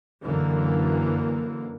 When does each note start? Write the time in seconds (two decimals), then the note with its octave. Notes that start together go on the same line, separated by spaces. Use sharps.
0.22 F#2 D3 E3 A#3